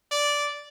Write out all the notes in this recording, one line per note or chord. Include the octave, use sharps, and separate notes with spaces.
D5